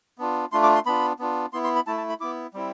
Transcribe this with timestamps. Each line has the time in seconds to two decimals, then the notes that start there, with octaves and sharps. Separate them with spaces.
0.18 B3 D4 F4
0.52 A3 D4 F4 C6
0.63 D6
0.75 C6
0.86 B3 D4 F4 B5
1.19 B3 D4 F4
1.53 B3 E4 C6
1.64 C6
1.76 B5
1.87 A3 E4 A5
1.97 A5
2.09 B5
2.20 B3 E4 D6
2.54 G3 C4 E4